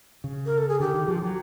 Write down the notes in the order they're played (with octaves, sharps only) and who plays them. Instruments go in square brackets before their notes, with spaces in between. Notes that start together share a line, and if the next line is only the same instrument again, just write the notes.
[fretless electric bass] C#3
[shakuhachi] A#4
A4
G#4
[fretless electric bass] D3 [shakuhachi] G4
[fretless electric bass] D#3
F3
F#3